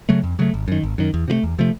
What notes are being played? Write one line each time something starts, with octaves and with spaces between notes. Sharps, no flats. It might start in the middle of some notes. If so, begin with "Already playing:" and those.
C#3 F#3 A3
F2
C#3 F#3 A3
G#1
F#2 D#3
G#1
F#2 D#3
E2
C3 F3 A3
E2
C3 F3 A3